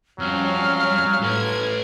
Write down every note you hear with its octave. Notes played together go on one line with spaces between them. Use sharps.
F2 F#3 G3 C#4 F5 F6
A2 A4 B4 G#6